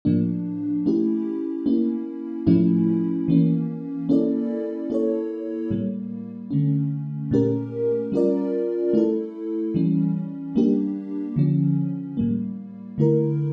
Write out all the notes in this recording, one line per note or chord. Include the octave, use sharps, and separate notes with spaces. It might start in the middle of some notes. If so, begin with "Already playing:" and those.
A2 F3 A#3 D4
A3 C#4 E4 G4
A#3 C#4 E4
A2 F3 A3 C#4 E4
E3 A#3 C#4
A#3 C#4 E4 A4 D5
A#3 E4 A4 C#5
A2 G3 A#3
D3 A3 C#4
A#2 A3 C#4 G4 A#4
G3 C#4 F4 A#4 D5
A3 E4 A4
E3 G3 C#4
G3 A#3 D4 G4
D3 F3 C#4
A2 G3 A#3
D3 A3 E4 A#4